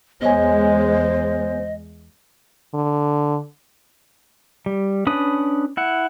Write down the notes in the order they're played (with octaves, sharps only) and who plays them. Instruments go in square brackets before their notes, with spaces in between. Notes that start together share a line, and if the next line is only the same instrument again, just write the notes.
[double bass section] E2 G#3 [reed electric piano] B3 C#5 G#5 [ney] C5 [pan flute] D#5
[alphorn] D3
[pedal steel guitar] G3
C#4 D4 B4 B5 D#6
E4 F#5